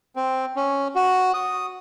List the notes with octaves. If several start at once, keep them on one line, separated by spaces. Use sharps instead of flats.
C4
C#4
F#4
D#6